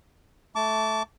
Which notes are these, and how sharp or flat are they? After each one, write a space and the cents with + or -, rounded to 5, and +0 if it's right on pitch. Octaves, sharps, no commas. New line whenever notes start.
A3 -10 A5 +0 D6 -30